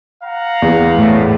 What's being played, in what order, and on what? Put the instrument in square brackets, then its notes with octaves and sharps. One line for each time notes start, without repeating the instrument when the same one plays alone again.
[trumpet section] F5 F#5 A#5
[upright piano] E2
[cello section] A2